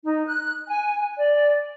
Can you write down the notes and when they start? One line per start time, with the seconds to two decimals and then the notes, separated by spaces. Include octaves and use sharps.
0.05 D#4
0.28 F#6
0.68 G#5
1.16 D5